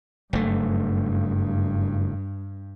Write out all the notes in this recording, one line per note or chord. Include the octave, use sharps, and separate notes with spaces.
F#1 G2 A3